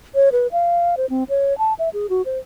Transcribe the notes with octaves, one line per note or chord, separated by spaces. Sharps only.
C#5
B4
F5
C5
C4
C#5
A5
E5
G#4
F#4
C5